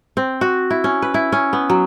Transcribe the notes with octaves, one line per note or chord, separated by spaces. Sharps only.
C4
F#4
E4
C#4
B4
E4
C#4
B3
F#3